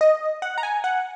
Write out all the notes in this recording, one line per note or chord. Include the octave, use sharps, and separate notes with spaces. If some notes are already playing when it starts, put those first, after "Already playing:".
D#5
F#5
A#5
G#5
F#5